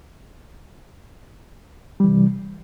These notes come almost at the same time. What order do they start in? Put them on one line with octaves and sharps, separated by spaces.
G3 E3 C3